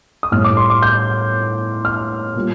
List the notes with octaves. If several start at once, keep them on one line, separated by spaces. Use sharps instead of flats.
D#6
A2 G3 F6
D6
C6
D6
G6
F6
A#2 G3